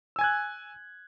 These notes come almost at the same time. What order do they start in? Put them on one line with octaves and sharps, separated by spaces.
E6 G#5 G#6 F#6